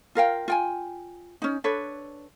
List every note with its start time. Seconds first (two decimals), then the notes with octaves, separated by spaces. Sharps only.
0.15 F4 A#4 F5 G5
0.48 F4 G5 G#5
1.42 C#4 D#4
1.64 D4 A4 B4 C#5